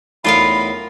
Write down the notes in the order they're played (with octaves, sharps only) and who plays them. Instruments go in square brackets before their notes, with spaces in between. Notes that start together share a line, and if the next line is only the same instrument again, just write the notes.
[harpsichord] E2 A2 D#4 [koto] F4 A#4 F5 [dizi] B5